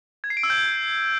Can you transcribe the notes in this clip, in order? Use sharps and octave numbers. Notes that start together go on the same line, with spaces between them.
G#6
C7
D7
E6
G6